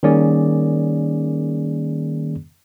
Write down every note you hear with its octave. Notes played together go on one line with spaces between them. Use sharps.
D#3 G3 A#3 C#4 G#4 D5